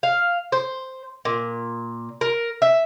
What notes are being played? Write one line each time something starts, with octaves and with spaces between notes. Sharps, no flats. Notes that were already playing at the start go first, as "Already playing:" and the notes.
F5
C5
A#2
A#4
E5